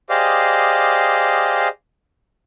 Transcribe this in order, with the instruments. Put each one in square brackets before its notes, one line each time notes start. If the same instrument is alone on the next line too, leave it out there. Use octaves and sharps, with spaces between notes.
[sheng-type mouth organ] G4 G#4 C5 D5 D#5 F5